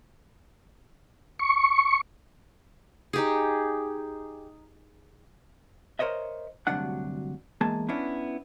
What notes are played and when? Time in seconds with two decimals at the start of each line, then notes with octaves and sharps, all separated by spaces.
1.39 C#6
3.13 D#4 G4 G#4
5.99 A#4 C5 C#5 D#5 E5
6.67 D2 G2 C3 F#3 D4 F#5
7.61 E2 G#3 A#3 G#4 A5
7.89 B3 C#4 D4 E4